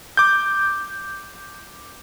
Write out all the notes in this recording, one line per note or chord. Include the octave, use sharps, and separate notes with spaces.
D6 G6